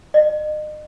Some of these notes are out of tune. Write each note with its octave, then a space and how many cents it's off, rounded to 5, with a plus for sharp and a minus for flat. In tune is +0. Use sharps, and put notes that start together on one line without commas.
D#5 -35